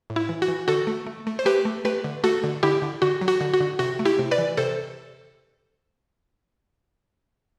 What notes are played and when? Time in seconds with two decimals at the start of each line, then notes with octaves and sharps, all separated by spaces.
0.10 A2
0.16 E4
0.29 E3
0.42 F#4
0.48 E3
0.68 D3 F#4 A4
0.87 A3
1.07 A3
1.27 A3
1.39 C5
1.45 A3 G4 B4
1.65 A3
1.85 A3 G4 B4
2.04 D3
2.24 A3 F#4 A4
2.44 D3
2.63 D3 E4 G4
2.82 D3
3.02 D3 F#4
3.21 F#3
3.28 F#4
3.41 D3
3.54 F#4
3.60 D3
3.79 C3 F#4
3.99 A3
4.05 E4 G4
4.19 C3
4.31 B4 D5
4.38 E3
4.57 C3 A4 C5